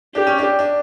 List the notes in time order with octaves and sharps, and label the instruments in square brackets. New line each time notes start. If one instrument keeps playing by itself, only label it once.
[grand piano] D4 [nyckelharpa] G4
[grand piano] C#4
D4
D4